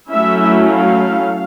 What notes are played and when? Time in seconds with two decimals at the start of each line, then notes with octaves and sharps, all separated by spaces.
0.11 F#3 A3 C#4 E4 E5
0.66 F5